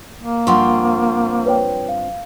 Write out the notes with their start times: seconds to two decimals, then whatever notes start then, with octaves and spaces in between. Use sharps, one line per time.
0.19 A#3
0.47 G2 F3 C4 F#5 C6 C#6
1.46 B4 C#5 G5
1.89 F5